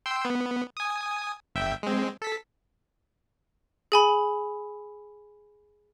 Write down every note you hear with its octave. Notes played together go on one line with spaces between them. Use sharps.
G5 C6 E6
B3
G#5 D#6
G1 E5 G5
G#3 C4
A4 B6
G#4 G#5 B5